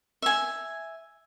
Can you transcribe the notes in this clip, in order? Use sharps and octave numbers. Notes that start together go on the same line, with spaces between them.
E5 G#5